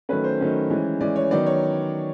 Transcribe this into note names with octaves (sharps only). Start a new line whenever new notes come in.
D#3 F#3 A3 C#4 B4
C5
D#3 F#3 A3 C#4
E3 G#3 C#4
E3 G#3 C#4 D5
C#5
D#3 F#3 B3 D5
C#5